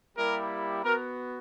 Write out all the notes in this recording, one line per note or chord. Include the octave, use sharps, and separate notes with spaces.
G3 A#3 E4 G4 A#4
B3 F#4 A#4